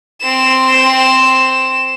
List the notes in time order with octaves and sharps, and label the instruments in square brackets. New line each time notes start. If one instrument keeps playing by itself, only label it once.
[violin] C4 E7